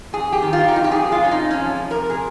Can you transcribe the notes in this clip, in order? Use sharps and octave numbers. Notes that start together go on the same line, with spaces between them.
F2 G#4
G4
D#3
F4
D#4
F2 F4
G4
G#4
G#3
F4
C#4
C3 D#4
C#4
F3
C3 A#4
G#4